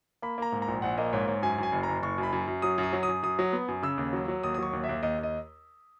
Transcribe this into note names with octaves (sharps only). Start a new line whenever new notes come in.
A#3 B5
A#3 A#5
G#2
A#5
A#1
A#1 F#5
A#3 D#5
G#2 C#5
G#2 C#5
F#2 G#5
F#2
G#5
F#1
A#5
F#1
F#1 C#6
F#2
B5
F#2
F#2
F#3 D#6
F#2
D#6
F#3
D#6
F#2
F#2 D#6
F#3
B3
F#2
C#3 E6
D#2
F#3
F#3
D#2 D#6
D#6
F#3 C#6
D#2
E5
D#2
D#2 D#5
D#2
D#5